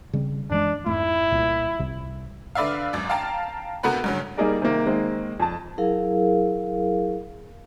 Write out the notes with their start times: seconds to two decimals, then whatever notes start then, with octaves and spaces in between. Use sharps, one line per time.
0.13 C#3 G3 C4
0.50 F#2 E3 G#3 D4
0.86 F2 G#2 A3 E4
1.32 C2 A#2
1.79 C2 C3
2.55 D3 B4 D5 E5 F5
2.93 G#1 F#2 D5
3.10 F5 G5 A5 A#5
3.83 C3 A3 B3 F#4 A#4 B4
4.04 G2 C#3 F#3
4.37 G3 A#3 D#4 G#4 A#4 D5
4.62 C3 D#3 A#3
4.86 D#3 G#3 A#3 C4
5.40 F2 A5
5.78 F#3 E4 G#4 A#4 F5